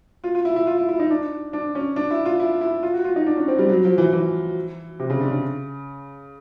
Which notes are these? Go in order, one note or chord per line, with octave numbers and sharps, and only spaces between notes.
F4
F4
E4
E4
F4
E4
E4
D#4
D4
D4
C#4
D4
E4
F4
E4
E4
F4
F#4
F4
D#4
D4
C#4
C4
G3
F#3
F3
E3
E3
C3
C#3
D3
C#3